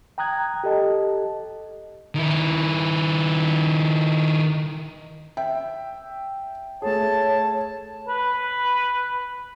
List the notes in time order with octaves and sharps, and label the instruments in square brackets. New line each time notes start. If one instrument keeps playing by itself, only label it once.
[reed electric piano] G5 A#5 D#6 F#6 G#6
G4 A4 D#5 A5
[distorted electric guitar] D#3 E4
[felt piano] E5 G5
[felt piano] A3 G#4 [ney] C#5 [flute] A5
[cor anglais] B4